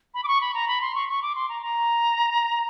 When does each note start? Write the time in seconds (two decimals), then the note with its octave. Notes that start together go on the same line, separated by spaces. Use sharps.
0.14 B5
0.24 D6
0.28 C#6
0.41 B5
0.54 A#5
0.68 B5
0.81 C6
0.95 C#6
1.09 C#6
1.22 D6
1.35 C6
1.49 A#5
1.62 A#5